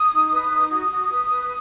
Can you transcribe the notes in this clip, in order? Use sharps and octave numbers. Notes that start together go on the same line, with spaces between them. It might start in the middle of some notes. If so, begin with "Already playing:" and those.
Already playing: D#6
D#4
B4
D#4
F#4 D#6
F#4
B4
B4